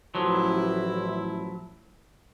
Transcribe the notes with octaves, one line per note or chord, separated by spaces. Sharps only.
A1 F3 F#3 E4